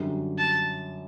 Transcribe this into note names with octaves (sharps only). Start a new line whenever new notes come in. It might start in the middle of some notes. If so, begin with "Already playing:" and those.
Already playing: F#2 D3 G3
A5